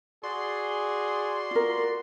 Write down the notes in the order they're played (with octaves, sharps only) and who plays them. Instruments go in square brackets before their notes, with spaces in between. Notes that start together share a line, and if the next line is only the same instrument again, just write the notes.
[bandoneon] F#4 D5 [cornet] G#4 [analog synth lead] C6
[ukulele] F4 A#4